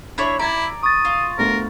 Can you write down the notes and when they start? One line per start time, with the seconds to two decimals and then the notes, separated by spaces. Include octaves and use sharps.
0.18 D4 E4 C#5 B5
0.39 E4 D5 A#5 G#6
0.83 C#6 D#6 A6
1.05 F4
1.38 D2 B3 A#4